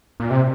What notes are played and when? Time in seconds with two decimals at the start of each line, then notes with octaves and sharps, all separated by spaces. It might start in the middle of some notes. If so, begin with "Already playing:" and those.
0.20 A#2
0.31 C3